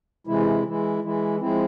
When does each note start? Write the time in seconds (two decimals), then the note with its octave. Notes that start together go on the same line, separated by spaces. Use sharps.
0.27 C3 E3 G#3 E4
0.64 E3 G#3 E4
1.02 E3 G#3 E4
1.40 F3 G#3 C4 E4